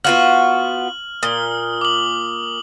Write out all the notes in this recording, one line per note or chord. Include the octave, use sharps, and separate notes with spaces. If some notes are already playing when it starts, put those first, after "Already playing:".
B3 F4 F#4 F6 F#7
A#2 D#6 G7
D6 F#7